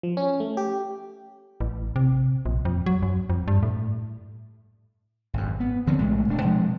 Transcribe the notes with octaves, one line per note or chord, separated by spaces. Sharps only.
F3
C#4
A3
G4
A1
C3
A#1
F2
F#3
F#2
F2
G2
A2
G#1 F#2
B3
D2 D3 F3 C4
B1 A2 G#3 A3
D#1 D4
B2 F3 G#3